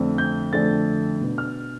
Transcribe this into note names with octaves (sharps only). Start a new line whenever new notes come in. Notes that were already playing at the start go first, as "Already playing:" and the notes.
Already playing: F2 D3 A3 C4
G6
F2 D3 A3 C4 A6
B2 B3 D4
F6